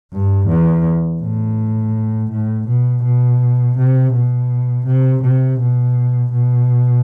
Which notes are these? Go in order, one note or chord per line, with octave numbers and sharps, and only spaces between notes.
G2
E2
A2
A2
B2
B2
C3
B2
C3
C3
B2
B2